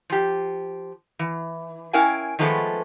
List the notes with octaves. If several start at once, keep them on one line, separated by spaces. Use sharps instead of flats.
F3 G4
E3
C#4 E4 A#4 F5 G5 G#5
D#3 F3 G#3 A3 B3 B4